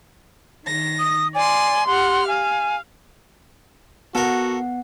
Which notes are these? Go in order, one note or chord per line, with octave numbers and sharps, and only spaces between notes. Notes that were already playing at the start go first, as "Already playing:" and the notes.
D#3 A#6
D#6
D5 G#5 C6
G4 F#5 C6 F6
F5 G#5
B3 F#4 A4 A#4 F#5